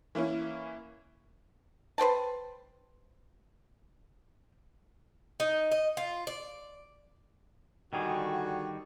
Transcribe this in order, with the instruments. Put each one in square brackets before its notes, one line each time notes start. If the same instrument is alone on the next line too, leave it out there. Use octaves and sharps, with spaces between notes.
[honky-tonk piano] E3 A#3 C#4 E4
[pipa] B4 C5 G5 A5
[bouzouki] D#4
D#5
F4
D5
[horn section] D3 F#4 [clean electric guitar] D#3 G3 G#4